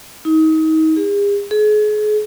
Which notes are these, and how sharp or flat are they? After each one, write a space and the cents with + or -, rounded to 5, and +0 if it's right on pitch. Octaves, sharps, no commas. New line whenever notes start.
D#4 +30
G#4 -45
G#4 +35